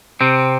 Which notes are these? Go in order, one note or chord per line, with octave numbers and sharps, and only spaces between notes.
C3 C4